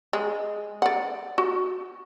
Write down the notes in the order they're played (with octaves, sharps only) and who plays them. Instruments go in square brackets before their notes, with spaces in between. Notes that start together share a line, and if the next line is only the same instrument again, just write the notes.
[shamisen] G#3
D5 F#5
F#4